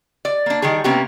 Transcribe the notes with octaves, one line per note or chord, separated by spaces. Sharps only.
D5
A#3 D4
D#3 G3 G4 G#4
C3 A#3 B3 C#4 F#4 G4